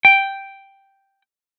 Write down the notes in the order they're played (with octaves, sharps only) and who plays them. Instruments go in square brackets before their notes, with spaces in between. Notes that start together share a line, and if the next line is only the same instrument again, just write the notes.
[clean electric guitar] G5